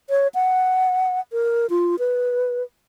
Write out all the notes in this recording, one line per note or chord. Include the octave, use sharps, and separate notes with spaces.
C#5
F#5
A#4
F4
B4